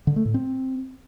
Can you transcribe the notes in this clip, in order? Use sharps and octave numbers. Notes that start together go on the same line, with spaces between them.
D3
A3
A2
C4